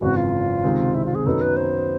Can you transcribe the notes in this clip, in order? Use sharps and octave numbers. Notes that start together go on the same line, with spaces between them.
G#1 F#2 C#3 E3 G#3 F#4
F4
C#2 C3 D#3 G#3 C4
E4
F4
G#4
F#2 D#3 F#3 B3 D#4 A4
B4
C5